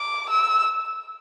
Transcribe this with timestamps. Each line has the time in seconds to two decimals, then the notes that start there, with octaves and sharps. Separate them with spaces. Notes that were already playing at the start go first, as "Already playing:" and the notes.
Already playing: D6
0.30 E6